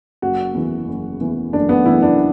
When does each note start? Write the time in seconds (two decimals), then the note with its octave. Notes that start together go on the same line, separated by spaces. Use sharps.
0.22 F#1 F#4
0.54 E2 E3
0.88 F#1
1.21 E2 E3
1.53 F#1 D4
1.69 B3
1.86 E2 E3 E4
2.02 D4